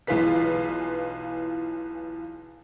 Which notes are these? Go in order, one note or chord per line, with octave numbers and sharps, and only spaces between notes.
B1 E3 F4 G#4 B4 B6